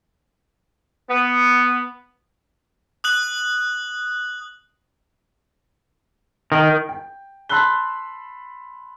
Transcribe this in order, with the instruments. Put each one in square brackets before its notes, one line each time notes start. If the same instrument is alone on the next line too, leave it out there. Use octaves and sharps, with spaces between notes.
[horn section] B3
[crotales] D#6 F#6 F#7
[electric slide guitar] D#3
[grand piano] G5
A5 B5 C6 E6 F#6 G7